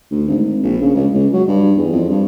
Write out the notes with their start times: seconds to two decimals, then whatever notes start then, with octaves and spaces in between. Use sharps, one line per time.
0.11 D2
0.28 G#1
0.63 A#1
0.82 C#3
0.94 C#2
1.14 C#2
1.33 F#3
1.48 G2
1.77 E2
1.92 F2
2.09 G2